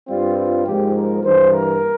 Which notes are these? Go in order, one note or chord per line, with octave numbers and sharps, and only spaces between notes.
G2 G3 C4 F4
F4
G#2 F3 A#3 G4
A#4
G2 E3 A#3 C5
A#4